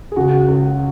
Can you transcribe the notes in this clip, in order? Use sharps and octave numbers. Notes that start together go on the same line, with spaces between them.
G#4
C#2 C#3 F#4
C#2 C#3